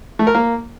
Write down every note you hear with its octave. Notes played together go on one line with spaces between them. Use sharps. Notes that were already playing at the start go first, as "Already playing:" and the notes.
A3
A#4
A#3